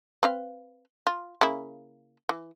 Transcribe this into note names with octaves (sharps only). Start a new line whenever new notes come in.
C4 B4 F5
F4
C#3 A#3 E4
E3